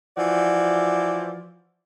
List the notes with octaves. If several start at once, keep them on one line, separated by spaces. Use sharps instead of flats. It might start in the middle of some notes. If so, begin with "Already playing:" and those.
E3 F3 F#4 D5